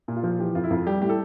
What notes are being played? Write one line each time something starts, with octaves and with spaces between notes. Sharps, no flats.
A#2
F4
F3
E3 G4
F2 F4
E4
F2 F4
G3 G4
A2 G4
A4